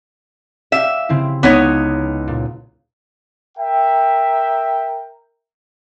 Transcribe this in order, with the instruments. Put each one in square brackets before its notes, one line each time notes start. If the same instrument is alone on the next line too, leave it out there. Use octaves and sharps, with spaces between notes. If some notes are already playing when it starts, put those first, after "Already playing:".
[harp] G4 F5 [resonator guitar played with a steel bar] E5
[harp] C#3 C4 E4
[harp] C#2 [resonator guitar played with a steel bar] B3 D#4 C#5
[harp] A#2
[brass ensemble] A#4 E5 G5